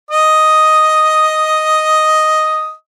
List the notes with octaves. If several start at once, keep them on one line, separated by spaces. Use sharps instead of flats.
D#5 D#6